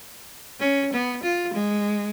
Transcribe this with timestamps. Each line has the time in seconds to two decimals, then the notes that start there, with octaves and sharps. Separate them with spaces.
0.60 C#4
0.93 B3
1.23 F4
1.53 G#3